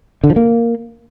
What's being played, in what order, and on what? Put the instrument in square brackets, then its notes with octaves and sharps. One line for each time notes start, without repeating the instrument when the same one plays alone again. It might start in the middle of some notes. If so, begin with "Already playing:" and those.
[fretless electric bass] D3
F3
A#3